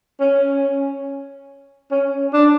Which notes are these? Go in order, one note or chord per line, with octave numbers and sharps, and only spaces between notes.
C#4
C#4
D4